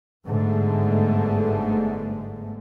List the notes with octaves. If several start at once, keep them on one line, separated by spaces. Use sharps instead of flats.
G1 G#2 D3 G#3 A3